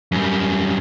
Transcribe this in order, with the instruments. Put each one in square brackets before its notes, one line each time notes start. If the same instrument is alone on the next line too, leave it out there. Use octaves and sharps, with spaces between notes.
[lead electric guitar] F#2 G3